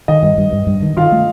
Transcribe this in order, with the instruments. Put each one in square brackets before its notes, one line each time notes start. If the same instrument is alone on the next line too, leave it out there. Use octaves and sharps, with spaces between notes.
[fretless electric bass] D#3 [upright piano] D#5
[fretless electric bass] G2
G2
G2
G2
D#3
[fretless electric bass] D#3 [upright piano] F4 F5
[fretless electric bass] A3